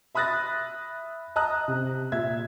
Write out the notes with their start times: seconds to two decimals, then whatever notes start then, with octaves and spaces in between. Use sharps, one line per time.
0.15 E5 B5 D#6 F#6 A6 A#6
1.36 D#5 A5 A#5 D#6 F#6
1.68 C3
2.12 A#2 E5 G#6